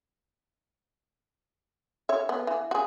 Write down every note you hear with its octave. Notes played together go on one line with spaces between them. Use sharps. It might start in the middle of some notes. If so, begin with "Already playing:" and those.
C#5 E5
B3
E3
F#4 G#4